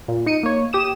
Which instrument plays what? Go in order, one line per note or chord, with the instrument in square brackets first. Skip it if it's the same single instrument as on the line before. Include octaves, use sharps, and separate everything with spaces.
[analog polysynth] A#2
D#4 C#7 D#7
A#3 C#5
G4 D#6 E7